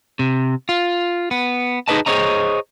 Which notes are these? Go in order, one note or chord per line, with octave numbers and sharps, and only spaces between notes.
C3
F4
B3
D#4 G#4 B4 D#5 A5
G#4 A4 C5 C#5 D#5 A#5